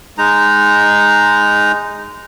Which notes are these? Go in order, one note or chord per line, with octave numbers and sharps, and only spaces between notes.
G#3 D#4 A#5